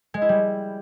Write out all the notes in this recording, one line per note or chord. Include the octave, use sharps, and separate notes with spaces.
G#3
E4
G3